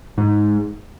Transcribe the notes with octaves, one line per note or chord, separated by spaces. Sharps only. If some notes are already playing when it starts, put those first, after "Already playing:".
G#2